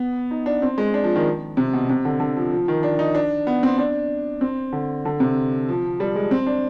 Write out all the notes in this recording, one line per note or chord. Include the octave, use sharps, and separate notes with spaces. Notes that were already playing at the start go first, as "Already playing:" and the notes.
Already playing: B3
D#4
D4
C4
G#3
D4
F3
D#3
C3
B2
C3
D3
D3
F3
F3
D#3
D4
D#4
D4
B3
C4
D4
C4
D3
D3
C3
F3
G3
G#3
C4
D4